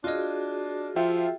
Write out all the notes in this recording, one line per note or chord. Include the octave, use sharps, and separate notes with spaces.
D4 F4 F#4 G#4 D#5
F3 F4 E5 G5